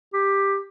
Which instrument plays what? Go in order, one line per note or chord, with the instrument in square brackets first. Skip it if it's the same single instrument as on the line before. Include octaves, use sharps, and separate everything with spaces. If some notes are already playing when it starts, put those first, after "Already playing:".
[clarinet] G4